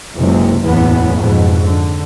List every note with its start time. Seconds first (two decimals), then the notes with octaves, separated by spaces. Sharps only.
0.15 F#1 C#2 C3
0.63 F#1 E2 A2 B3
1.18 F2 G#2 B2
1.68 D3